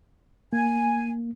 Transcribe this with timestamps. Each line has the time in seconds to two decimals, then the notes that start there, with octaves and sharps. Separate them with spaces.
0.53 A#3 G#5